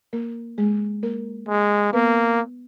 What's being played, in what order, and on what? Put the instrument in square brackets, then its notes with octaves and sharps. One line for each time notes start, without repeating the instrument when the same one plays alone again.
[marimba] A#3 A#4
G#3 G#4
A#3 A#4
[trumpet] G#3
[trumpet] A#3 [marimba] B3 B4